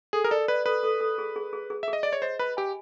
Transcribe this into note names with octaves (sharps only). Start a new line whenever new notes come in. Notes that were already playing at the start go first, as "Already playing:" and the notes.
G#4 A4
A#4
A4 D5
B4 D5
A4 B4
A4
A4
G#4
G#4
G#4
G#4
E5
G#4
D#5
D5 D#5
C#5
C5 D#5
B4 B5
G4 G#5